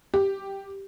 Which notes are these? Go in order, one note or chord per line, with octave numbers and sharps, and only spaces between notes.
G4